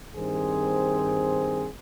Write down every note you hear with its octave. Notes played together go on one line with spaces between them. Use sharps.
G2 D#3 C4 G#4 C5